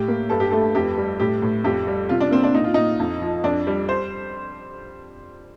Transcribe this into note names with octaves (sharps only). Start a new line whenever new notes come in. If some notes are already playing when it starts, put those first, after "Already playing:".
Already playing: A2 G4
A#3
G2 A4
G4
A3 A4
F2 G4
G3
A2 G4
A2
F2 G4
G3
C3 F4
D4
A#3 C4
D4
A#2 D#4
F4
A#2 D#4
F2
F3
F2 D4
G3
C5